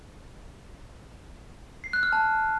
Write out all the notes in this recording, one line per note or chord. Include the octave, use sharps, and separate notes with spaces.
C7
F#6
F6
A5